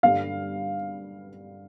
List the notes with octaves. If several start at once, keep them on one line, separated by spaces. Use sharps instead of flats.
G2 D3 G3 F5